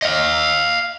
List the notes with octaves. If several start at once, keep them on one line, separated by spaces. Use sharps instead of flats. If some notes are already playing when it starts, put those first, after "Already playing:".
D#5 F5